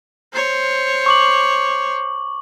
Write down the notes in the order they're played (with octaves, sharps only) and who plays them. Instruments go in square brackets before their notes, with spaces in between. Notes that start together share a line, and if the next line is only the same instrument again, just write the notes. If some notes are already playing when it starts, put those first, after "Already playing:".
[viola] C5 C#5
[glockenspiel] C#6 D6 F#7